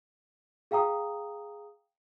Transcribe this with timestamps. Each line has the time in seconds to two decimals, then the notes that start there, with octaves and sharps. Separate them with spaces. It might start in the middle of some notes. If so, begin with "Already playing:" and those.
0.71 G#4 F5 G5 A#5 D#6